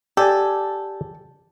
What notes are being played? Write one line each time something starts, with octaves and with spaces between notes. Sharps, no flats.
G4 A4 D5 G#5